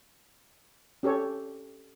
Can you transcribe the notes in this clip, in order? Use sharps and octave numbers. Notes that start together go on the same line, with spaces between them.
C#4 G4 A4 C#5